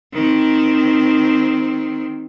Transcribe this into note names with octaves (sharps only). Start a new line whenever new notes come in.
D#3 C4